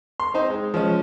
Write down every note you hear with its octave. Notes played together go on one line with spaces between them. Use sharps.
C6
C4 D#4 C5
G#3
F3 G#3 C#4